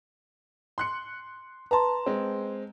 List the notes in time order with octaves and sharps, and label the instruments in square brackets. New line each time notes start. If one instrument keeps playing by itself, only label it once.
[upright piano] C6 F#6 C#7
[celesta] B4 C6 [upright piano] A5 A#5
[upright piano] G#3 C4